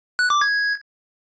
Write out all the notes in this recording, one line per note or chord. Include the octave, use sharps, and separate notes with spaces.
F#6
D6
G#6